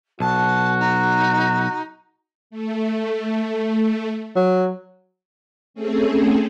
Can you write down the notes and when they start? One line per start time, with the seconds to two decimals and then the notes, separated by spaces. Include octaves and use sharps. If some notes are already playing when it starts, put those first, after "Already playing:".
0.20 B1 F#4 A5
0.79 D#4
2.50 A3
4.36 F#3
5.74 A3 C4 C#4 G#4 A4